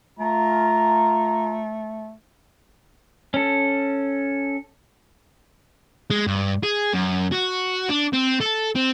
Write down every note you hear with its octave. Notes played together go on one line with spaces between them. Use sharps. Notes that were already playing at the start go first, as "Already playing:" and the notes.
A3 F4 A#5
C#4 A4
G#3
G2
G#4
F#2
F#4
D4
C4
A4
C4